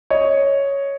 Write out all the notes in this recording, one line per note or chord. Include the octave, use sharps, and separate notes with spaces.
C#5 D#5